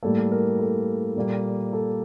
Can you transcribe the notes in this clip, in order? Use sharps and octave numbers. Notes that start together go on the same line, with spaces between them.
A2 G3 A#3 A4
A#4
A4
A#2 G3 A#3
A4